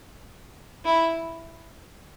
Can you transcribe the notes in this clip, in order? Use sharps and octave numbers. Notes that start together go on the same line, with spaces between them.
E4